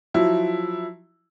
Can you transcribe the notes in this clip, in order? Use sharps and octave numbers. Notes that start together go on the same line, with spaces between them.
F3 F#3 E4